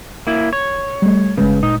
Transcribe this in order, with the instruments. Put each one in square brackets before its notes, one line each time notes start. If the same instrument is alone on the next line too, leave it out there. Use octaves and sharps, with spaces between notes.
[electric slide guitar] A#3 E4
C#5
[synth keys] G3 A3
[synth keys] G1 G#3 B4 [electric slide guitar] C#3
[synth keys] A#2 [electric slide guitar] D#4